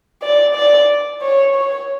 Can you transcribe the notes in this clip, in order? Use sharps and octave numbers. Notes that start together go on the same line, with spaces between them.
D5
D5
C#5
C#5